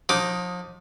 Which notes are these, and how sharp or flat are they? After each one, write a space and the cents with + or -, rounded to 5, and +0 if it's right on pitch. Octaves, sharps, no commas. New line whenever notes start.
F3 +40 D#4 +0 D6 +0